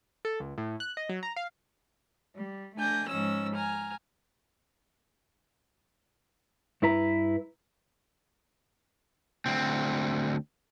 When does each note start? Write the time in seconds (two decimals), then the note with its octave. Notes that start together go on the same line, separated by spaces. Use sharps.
0.25 A4
0.40 C#2
0.58 A2
0.80 F#6
0.97 D#5
1.09 F#3
1.23 A#5
1.36 F5
2.37 G3
2.76 A3 D4 G#5 G6 A#6
3.08 G#2 F3 C#4 E6 A#6
3.54 G#5 A#5 F6
6.82 G2 E4 B4 A#5
9.46 D2 C4